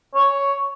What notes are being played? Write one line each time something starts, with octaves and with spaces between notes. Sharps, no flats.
C#5